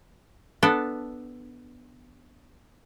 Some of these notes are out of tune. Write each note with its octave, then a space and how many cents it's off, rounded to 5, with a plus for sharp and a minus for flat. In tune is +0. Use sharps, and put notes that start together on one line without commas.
B3 +0 D4 +0 A4 +0